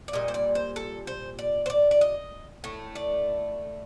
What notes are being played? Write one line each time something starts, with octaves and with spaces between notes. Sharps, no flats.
D5
A#2 G3 D#5
C5
D5
C5
A4
C5
D5
C5
D5
D5
D#5
A2 A3
D5